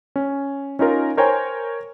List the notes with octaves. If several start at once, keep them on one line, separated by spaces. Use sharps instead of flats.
C#4
C#4 D#4 F4 A#4
A#4 C5 C#5 G5 G#5 A#5